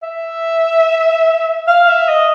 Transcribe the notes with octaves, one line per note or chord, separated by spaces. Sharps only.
E5
F5
E5
D#5